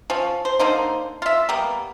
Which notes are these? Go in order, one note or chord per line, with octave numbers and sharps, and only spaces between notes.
F3 C#4
C5
D3 A#3 D#4 C5
F4 E5
G3 A#3 B3